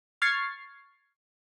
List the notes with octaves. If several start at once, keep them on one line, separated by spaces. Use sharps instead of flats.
C#6 F6 G#6 A6 C7